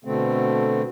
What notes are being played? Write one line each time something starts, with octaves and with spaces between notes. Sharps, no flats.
B2 D3 A3 C4